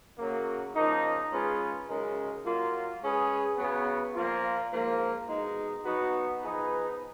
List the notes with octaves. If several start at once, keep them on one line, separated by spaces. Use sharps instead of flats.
F#2 C#3 F#3 A#3
C#3 F3 A#3 D#4
G#3 C#4 F4 G#4 B4
F#2 C#3 G#3 D#4 A#4
F#3 A#3 F4
G#3 C#4 G#4 B4
C#3 F#3 B3
A#2 F3 A#3 F4
G#2 F3 A#3
B2 G#3 D#4
F#3 B3 D#4 F#4
F3 B3 D#4 G#4 B4